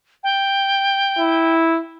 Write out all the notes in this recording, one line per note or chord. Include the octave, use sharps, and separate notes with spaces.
G5
E4